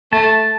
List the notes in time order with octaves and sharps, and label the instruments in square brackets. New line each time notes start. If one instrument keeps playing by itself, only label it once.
[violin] A3 [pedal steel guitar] A5